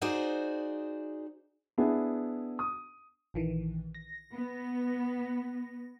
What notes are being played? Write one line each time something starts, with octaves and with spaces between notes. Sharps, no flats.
D#4 F#4 G#4 C5 D5
B3 D4 E4 G#4
D#6
A#1 D#3 E3
A#6
B3